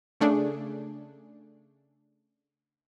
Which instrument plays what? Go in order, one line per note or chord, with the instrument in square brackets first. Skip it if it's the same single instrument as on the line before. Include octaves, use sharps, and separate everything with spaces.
[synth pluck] C#3 A3 D4 G#4